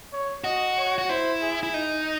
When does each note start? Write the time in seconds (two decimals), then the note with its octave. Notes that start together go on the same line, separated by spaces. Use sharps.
0.13 C#5
0.44 F#4 D#5
0.77 C#5
0.98 F#4
1.09 E4 C5
1.42 G#4
1.63 E4
1.74 D#4